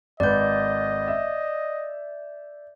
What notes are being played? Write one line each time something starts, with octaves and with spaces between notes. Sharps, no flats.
G#1 B4 D5 D#5 G6
E5